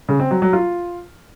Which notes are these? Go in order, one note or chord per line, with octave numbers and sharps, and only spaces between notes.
C#3
C4
F#3
F#3
F4